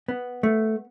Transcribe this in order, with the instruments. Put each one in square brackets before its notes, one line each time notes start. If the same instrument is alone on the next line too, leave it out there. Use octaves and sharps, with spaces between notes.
[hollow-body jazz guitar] B3
A3